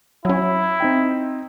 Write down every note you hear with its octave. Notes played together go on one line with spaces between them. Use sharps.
F#3 C#4 E4
C4 D#4 G5